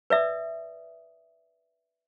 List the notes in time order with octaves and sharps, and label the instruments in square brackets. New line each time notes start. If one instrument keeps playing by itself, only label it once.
[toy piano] B4 D5 E5 D#6